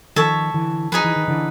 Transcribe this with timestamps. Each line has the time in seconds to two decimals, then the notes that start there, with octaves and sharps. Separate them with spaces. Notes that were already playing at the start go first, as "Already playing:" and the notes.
0.16 D#3 F3 A4 C#5 E5
0.54 D3 E3
0.92 F3 D#4 G#4 B4
1.04 E3
1.16 D#3
1.28 D3 E3